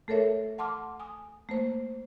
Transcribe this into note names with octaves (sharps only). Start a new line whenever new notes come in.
A3 A4 A#4 C#5 E5
F#5 A5 C6 D6 F6
G#5 D#6
A3 A#3 C5